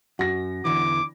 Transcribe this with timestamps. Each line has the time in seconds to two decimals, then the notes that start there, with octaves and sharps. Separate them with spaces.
0.19 F#2 F#4 A#6
0.65 E2 D3 E3 D6